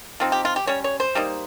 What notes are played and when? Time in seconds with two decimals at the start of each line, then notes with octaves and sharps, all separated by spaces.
0.20 F3 C4 D#4
0.32 G4
0.45 F4
0.56 G4
0.67 G3 C#4 C#5
0.84 C#5
1.00 C5
1.15 G3 A#3 D#4